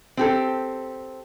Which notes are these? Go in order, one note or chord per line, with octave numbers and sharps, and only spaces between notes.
C4 G4 A4